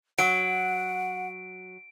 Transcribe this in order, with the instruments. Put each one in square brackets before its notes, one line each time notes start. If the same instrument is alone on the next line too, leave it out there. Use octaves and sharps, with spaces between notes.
[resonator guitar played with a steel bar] F#3 [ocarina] F#5 [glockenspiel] D7